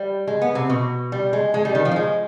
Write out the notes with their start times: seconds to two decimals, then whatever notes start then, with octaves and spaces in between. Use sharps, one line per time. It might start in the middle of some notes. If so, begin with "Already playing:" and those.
Already playing: G3
0.27 G#3
0.42 B3
0.55 C3
0.70 B2
1.12 G3
1.33 G#3
1.54 G#3
1.65 G3
1.75 D#3
1.85 F3
1.92 G3
1.96 G#3